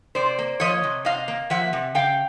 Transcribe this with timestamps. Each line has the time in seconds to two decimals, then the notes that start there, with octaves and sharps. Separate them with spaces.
0.15 C3 C5 D5
0.39 A#3
0.60 F3 C#5 D#5
0.83 C3
1.05 C3 D#5 F5
1.28 A#3
1.50 F3 E5 F#5
1.73 C3
1.95 C#3 F5 G5